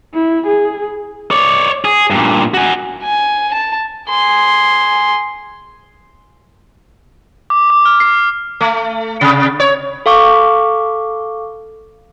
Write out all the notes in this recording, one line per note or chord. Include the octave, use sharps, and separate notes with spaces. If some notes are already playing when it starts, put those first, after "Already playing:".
E4
G#4
C#5 D5
G#4
G2 A#2
F#4 G#5
G#5
A5
G#4 C6
D6
D6
F6
C7
A3
C3
C#5
A4 F5 C#6 D6